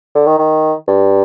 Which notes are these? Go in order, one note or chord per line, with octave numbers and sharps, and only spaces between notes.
D3
D#3
D#3
G2